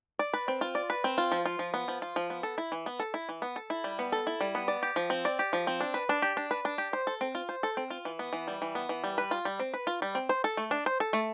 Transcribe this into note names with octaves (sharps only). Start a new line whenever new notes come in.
D5
B4
C4
F4
D5
B4
C4
F4
F3
F4
F3
B3
F3
F4
F3
B3
A4
E4
E3
B3
A4
E4
E3
B3
A4
E4
G3
B3
A4
E4
G3
B3
D5
G4
F3
C4
D5
G4
F3
C4
D4
B4
D4
G4
D4
B4
D4
G4
C5
A4
C4
F4
C5
A4
C4
F4
E3
B3
E3
G3
E3
B3
E3
G3
B4
F4
G3
C4
B4
F4
G3
C4
C5
A4
A3
D4
C5
A4
A3